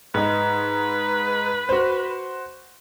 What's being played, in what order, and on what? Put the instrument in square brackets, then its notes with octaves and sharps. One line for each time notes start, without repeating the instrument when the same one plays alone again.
[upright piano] G#2 D#4 [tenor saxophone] B4
[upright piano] F#4 C5